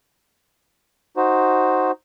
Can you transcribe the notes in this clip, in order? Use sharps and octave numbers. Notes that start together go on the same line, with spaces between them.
D#4 F#4 C5